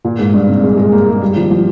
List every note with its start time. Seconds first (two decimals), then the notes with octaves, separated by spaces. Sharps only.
0.04 A#2
0.19 G#2
0.34 G2
0.48 C3
0.63 G#3
0.77 G#3
0.92 A#3
1.07 G#3
1.22 G3
1.36 F3
1.51 F3